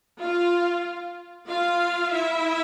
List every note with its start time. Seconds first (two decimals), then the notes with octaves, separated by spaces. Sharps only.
0.19 F4 F5
1.48 F4 F5
2.12 E4 E5